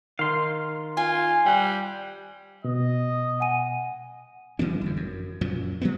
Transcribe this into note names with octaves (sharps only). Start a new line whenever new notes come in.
D#3 F5 C6
F4 G#5
G3 G5 F#6
B2 D#5
F#5 G#5 D#7
D3 E3 G3 C#4
G1 F2
F#2
F#2 A#2 F3
F3 G#3 A3 B3